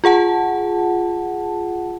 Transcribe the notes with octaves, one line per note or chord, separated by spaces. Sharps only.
F4 G#4 F#5 A5